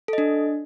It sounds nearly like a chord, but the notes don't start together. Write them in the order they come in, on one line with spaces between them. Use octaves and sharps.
A4 D#5 D4